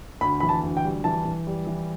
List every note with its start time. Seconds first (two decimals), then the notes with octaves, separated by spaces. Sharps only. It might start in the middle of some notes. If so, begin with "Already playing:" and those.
0.21 D2 B5
0.40 E3 B5
0.49 A5
0.63 D2
0.77 G5
0.84 G3
1.04 E3 A5
1.25 E3
1.47 G3
1.67 E3